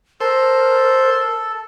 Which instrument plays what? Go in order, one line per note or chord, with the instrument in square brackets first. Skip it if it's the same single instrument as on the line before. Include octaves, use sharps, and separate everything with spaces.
[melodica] A4 [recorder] A#4 [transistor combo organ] C5